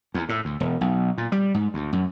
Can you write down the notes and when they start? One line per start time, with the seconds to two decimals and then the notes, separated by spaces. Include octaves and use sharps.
0.14 E2
0.29 A2
0.45 D2
0.60 E1
0.81 B1
1.18 A#2
1.32 G3
1.54 G#2
1.74 D2
1.93 F#2